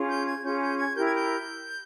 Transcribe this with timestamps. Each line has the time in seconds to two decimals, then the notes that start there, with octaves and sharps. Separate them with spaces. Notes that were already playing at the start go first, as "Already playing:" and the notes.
Already playing: C#4 F4 G#4
0.10 G6
0.27 G#6
0.44 C#4 F4 G#4 G6
0.61 G6
0.78 G#6
0.95 E4 G4 A#4 G6
1.05 G#6
1.15 G6